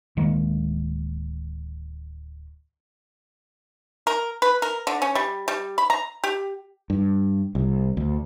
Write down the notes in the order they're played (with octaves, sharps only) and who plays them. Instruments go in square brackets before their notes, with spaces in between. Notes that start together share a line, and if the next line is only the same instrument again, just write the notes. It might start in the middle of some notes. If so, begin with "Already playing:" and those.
[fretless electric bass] D1 D#3 G#3 A#3
[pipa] A#4
B4
A#4
D3
C#4
G3
G3
B5
A#5
G4
[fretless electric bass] G2
C2
D2